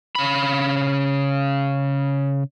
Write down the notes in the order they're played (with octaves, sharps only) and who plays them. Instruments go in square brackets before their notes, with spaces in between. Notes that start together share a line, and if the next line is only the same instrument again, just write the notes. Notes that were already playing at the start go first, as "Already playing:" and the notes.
[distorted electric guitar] C#3 B5